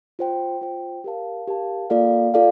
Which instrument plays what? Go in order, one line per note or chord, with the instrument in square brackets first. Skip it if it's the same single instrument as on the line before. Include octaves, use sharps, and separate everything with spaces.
[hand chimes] F4 C5 G5
F4 C5 G5
G4 A#4 F5 A5
G4 A#4 F5 A5
A#3 F4 A4 D5 F5
F4 A4 D5 F5